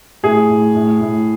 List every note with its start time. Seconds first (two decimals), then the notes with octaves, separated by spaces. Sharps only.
0.23 A2 G#4
0.50 A2
0.75 A2
1.01 A2